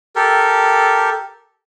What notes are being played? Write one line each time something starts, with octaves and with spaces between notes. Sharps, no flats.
G4 A4 A#4